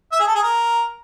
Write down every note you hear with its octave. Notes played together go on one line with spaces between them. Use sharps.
E5
G#4
A4
G#4
A#4